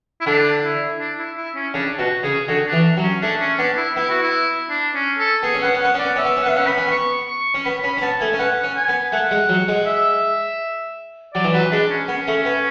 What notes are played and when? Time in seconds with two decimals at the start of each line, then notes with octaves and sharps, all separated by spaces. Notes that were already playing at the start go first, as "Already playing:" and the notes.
0.21 E4
0.26 D3 D4
0.63 E4
1.00 D4
1.19 E4
1.37 E4
1.55 C#4
1.74 C#3 D4
1.99 B2 F#4
2.23 C#3 G#4
2.48 D3 F#4
2.67 D4
2.73 E3
2.97 F#3
3.03 C#4
3.22 A3 D4
3.40 C#4
3.59 B3 D4
3.77 E4
3.96 B3 E4
4.10 F#4
4.23 E4
4.70 D4
4.95 C#4
5.19 A4
5.43 B3 G#4
5.54 C#4
5.62 B3 F#5
5.74 C#4
5.81 B3 F#5
5.94 C#4 D5
6.05 B3
6.16 C#4 E5
6.25 B3
6.36 C#4
6.42 F#5
6.46 B3 E5
6.56 C#4 F#5
6.67 B3 B5
6.77 C#4
6.87 B3 C#6
7.28 C#6
7.54 C#4
7.65 B3 B5
7.84 C#4 B5
7.97 C#4
8.02 B3 A5
8.21 A3 G#5
8.34 C#4
8.39 B3 F#5
8.64 C#4
8.76 G#5
8.88 B3
9.12 A3 F#5
9.31 G#3
9.49 F#3
9.68 G#3
9.86 E5
11.34 F#3 D5
11.44 E3
11.53 F#3 B4
11.72 G#3 D4
11.90 C#4
12.08 B3 C#4
12.27 A3
12.45 B3